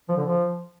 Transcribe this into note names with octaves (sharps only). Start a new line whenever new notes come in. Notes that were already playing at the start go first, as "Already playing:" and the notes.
F3
D3
F3